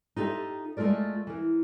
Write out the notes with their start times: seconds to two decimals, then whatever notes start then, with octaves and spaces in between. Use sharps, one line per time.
0.16 D#4 F4 G4 A4 E5
0.77 G#3 A3 F4 A#4 D5
1.27 E3 A#4